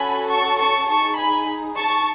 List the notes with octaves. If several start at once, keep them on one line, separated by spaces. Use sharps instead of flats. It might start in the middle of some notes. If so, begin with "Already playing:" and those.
Already playing: C#4 F#4 A4 G#5 B5
A5 C#6
A5 C#6
D#4 G#4 A5 C#6
G#5 B5
A5 C#6